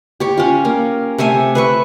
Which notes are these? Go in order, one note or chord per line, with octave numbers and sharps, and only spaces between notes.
G4 C#5
C#4 F4
A#3
C3 A3 E5 G#5
B4 E5 C#6